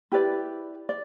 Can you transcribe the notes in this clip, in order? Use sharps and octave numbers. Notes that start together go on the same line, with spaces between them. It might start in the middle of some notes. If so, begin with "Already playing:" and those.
E4 G4 B4 D5
D5